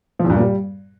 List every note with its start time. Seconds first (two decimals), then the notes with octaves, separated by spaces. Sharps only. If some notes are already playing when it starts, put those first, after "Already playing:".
0.19 F3
0.25 E2
0.30 G2
0.35 A#2
0.40 G3